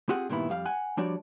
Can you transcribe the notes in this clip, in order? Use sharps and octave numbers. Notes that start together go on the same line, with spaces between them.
C4 F4 G4 G#4 F#5
G2 A#2 D#3 B3 E4
F2 G3 F5
F#5 G#5
F3 G3 D4 F#4 C#5 D5